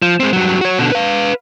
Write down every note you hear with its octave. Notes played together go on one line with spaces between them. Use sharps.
F3
G#3 C4
G2 F#3
F#4 C#5
B2 D3
B4 F5